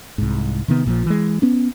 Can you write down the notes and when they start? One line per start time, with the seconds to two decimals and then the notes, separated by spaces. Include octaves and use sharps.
0.18 C2 G#2
0.68 C3 D#3 B3
0.86 A#1 A#2 D3 F3
1.06 E3 G#3
1.42 B3 C#4